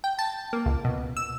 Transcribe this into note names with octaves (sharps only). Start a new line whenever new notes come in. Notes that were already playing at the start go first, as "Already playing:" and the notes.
G5
A5
A#3
C#2
B2
E6